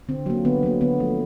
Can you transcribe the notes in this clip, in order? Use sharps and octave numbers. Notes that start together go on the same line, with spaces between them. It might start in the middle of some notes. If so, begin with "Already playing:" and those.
D3 C4
F#3 A#3
D3 B3
F#3 A#3
D3 B3
F3 A3